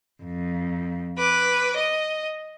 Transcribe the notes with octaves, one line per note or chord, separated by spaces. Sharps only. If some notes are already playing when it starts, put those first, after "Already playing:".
F2
B4 D6
D#5